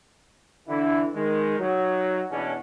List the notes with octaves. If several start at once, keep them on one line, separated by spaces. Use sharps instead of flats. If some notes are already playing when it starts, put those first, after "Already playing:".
D3 E3 E4
D#3 G#3
F#3 D#4
E2 B2 C#4 D4